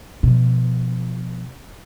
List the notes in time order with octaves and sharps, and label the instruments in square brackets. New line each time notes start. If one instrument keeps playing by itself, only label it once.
[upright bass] B2 F3